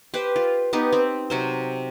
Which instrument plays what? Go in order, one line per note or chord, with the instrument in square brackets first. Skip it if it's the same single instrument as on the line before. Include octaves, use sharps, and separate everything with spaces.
[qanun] G4 B4 C5
F4
B3 D#4 G4
C4
C3 F#3 C5